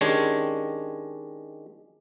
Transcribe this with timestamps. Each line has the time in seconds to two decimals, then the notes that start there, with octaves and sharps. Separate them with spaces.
0.01 D#3 G#3 C#4 D4 G4 C#5